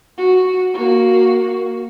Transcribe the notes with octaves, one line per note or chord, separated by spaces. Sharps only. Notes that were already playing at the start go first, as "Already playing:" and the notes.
F#4
A#3 F#4